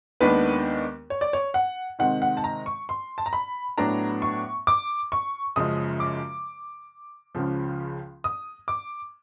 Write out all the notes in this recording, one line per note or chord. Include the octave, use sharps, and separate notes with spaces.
D#2 D#3 G#3 B3 D4 B4
C#5
D5
C#5
F#5
C3 D#3 G#3 C4 F#5
F#5
A5
A#5
C#6
C6
A5
A#5
B5
A2 F#3 B3 D4 A#5
C#6
D6
C#6
F#2 C#3 F3 G#3 D#6
D6
C#2 C#3 F3
D#6
D6